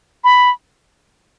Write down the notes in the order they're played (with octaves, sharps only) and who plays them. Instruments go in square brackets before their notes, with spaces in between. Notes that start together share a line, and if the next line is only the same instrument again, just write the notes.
[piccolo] B5